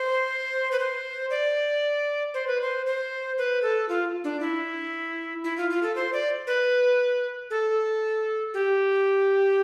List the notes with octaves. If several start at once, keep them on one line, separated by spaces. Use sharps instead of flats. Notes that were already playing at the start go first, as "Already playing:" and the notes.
Already playing: C5
B4
C5
D5
C5
B4
C5
C5
B4
A4
F4
D4
E4
E4
F4
F4
A4
C5
D5
B4
A4
G4